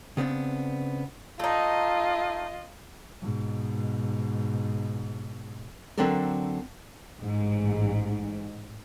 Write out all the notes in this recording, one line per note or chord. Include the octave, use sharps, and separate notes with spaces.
C#3 B3 C4 D4
A3 D#4 F4 D#5
G#2 B2
D3 F#3 C4 D4 A4 A#4
A1 G#2